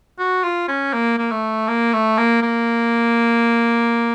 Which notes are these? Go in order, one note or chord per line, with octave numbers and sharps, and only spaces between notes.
F#4
F4
C#4
A#3
A#3
A3
A#3
A3
A#3
A#3